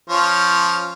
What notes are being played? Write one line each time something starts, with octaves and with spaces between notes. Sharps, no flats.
F3 C#4 C#5